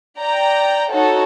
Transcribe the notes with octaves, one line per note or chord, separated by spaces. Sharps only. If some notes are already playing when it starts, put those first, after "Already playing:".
D5 G5 A#5
D#4 F#4 A4 C#5